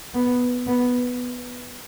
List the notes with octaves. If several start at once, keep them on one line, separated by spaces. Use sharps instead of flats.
B3
B3